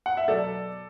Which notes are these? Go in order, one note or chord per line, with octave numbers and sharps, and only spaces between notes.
F#5
E5
B2 F#3 A4 D5